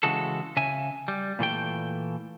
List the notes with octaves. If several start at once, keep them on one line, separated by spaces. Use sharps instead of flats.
C#3 E3 G#3 F#4 A4
C#3 E5 G#5
G3
A#2 E3 A3 G5